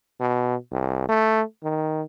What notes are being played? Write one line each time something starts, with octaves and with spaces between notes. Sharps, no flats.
B2
C2
A3
D#3